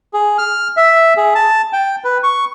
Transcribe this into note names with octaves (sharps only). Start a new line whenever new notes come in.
G#4
F6
E5
G#4
A5
G5
B4
C#6